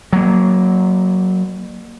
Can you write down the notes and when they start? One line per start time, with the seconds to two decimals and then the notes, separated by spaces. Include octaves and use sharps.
0.13 F#3 A#3